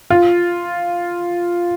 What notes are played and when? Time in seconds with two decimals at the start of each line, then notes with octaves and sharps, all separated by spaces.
0.10 F4